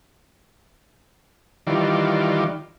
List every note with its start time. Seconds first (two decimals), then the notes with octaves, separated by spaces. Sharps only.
1.67 D#3 E3 G3 F4 D5